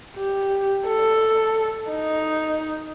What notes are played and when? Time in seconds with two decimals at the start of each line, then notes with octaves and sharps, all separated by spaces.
0.17 G4
0.87 A4
1.91 D#4